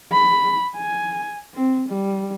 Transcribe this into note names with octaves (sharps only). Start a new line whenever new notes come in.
B5
G#5
C4
G3